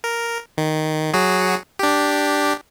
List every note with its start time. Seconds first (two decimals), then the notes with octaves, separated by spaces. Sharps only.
0.04 A#4
0.58 D#3
1.14 F#3 F#4 G#4
1.79 D4 G4